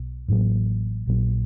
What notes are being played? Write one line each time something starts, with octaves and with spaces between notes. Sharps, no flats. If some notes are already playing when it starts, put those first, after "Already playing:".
Already playing: B1 B2
A1 A2 F#3 A#3
A#1 A#2 F#3